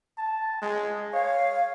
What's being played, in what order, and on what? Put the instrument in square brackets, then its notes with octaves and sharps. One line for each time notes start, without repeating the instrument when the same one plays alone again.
[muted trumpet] A5
G#3
[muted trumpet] C#5 [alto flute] F5